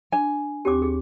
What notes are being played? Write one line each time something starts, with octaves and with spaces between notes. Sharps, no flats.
D4 G#5
D#2 C4 G4 C#5 D6
G#4